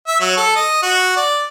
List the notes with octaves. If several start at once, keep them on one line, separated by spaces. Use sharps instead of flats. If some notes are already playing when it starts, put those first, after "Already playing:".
E5
F#3
A4
D#5
F#4
D5